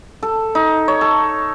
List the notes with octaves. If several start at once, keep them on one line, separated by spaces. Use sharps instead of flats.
A4
D#4
C#5
A4